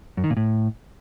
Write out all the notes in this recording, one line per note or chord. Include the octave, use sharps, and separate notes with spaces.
F#2
D#3
A#2
A2